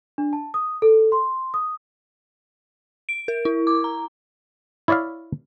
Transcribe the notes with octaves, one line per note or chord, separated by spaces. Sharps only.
D4
A5
D#6
A4
C6
D#6
D7
A#4
E4
D6
A#5
E4 C#5 D5 E5 F5